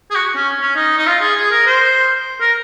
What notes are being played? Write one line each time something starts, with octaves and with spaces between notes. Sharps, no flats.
G#4
F#4
C#4
C#4
D#4
D#4
F4
G#4
G#4
A#4
C5
A#4